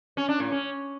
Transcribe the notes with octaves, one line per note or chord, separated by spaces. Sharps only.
C#4
D4
A2
C#4